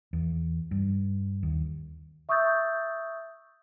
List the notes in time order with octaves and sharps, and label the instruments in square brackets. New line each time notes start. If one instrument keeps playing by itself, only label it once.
[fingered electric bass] E2
G2
D#2
[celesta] E5 C#6 D#6 E6 G6 A6